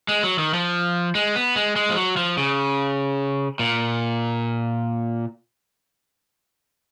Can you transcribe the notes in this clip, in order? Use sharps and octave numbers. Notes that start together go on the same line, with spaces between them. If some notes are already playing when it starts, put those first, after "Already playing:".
G#3
F#3
D#3
F3
G#3
B3
G#3
G#3
F3
F#3
F3
C#3
A#2